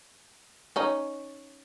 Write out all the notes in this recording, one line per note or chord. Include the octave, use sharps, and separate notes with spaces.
C#4 D#4